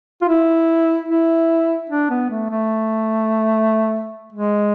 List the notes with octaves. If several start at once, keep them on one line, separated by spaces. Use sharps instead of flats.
F4
E4
E4
D4
B3
A3
A3
G#3